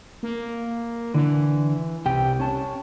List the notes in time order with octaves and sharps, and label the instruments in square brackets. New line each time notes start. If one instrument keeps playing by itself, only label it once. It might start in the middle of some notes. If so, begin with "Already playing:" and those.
[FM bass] A#3
[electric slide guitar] D3 [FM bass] E3
[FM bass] C2 [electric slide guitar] C3 G4 G5
[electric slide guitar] C#4 A5